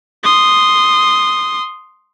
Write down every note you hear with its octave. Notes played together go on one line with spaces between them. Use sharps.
C6 D#6